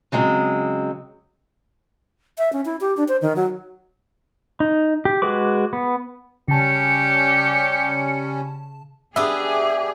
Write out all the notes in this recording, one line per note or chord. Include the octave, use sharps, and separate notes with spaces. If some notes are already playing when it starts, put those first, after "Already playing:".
C#3 F#3 G#3 C4
E5
C#4
E4
G4
D4
C5
D#3
F#3
D#4
G4
G#3 F#4 G#4 B4 D6
B3
C#3 G3 C#4 G4 A5 C#7
B3 D4 G4 G#4 E5